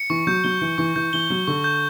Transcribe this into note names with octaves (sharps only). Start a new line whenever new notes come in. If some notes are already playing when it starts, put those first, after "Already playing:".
Already playing: C#7
E3 C#6
F#3 G6
F#3 G7
E3 C#7
E3 C#6
E3 G6
E3 G7
F#3 C#7
D3 C#6
G6